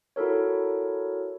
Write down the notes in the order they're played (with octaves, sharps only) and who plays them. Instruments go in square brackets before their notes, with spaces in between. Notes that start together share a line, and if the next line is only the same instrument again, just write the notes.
[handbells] E4 F#4 A4 A#4 C#5